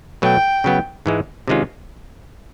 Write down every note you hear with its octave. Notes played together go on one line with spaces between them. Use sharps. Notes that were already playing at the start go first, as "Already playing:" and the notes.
B2 F#3 A3 G5
C#3 F#3 B3
G#2 E3 G#3
C3 D#3 G#3 C#4 F4